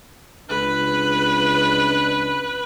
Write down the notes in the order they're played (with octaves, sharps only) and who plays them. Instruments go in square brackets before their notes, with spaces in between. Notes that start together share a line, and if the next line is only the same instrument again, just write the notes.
[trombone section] C#2 D4 [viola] B4